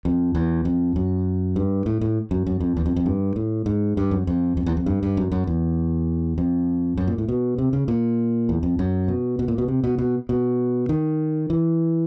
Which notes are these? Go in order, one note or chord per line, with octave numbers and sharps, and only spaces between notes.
F2
E2
F2
F#2
G2
A2
A2
F#2
F#2
F2
E2
F2
F2
G2
A2
G#2
G2
F#2
F2
F2
E2
F2
G2
G2
F#2
F#2
E2
F2
F#2
A#2
A2
B2
C3
C#3
A#2
E2
F2
F#2
B2
B2
A#2
B2
C3
B2
B2
B2
D#3
E3